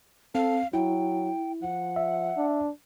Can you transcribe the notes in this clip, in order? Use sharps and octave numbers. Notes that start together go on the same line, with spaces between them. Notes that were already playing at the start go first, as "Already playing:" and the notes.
C4 A4 F5
F#3 E4 G5
F3 F#5
E5
D4